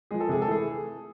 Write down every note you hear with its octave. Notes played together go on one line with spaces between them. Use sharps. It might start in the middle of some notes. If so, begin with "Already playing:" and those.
F3 G#3 G#4
A4
C3 G#4
A4
E3 A3 G#4